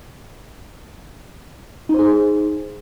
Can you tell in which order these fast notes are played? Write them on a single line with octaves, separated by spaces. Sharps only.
D#4 C5 G#4